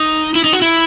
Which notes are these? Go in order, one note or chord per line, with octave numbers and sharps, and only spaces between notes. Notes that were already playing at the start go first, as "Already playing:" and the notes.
Already playing: D#4
E4
D#4
F#4
E4